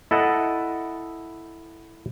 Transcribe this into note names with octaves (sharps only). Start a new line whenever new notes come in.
E4 A4 D#5 F#5